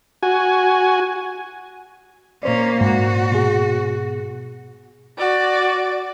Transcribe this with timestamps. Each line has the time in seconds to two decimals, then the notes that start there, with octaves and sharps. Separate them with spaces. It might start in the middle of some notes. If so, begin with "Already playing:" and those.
0.23 F#4 G#5
2.43 A#2 A#3 C#4 C5 D5
2.81 G#2 F#4
3.32 B2 G#4
5.18 F#4 D5